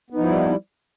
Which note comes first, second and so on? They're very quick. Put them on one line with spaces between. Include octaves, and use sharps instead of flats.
B3 D#4 F3 E4 G3